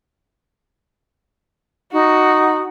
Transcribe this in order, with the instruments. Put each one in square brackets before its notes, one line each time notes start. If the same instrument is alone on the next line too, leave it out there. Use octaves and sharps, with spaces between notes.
[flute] D#4 [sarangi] F#4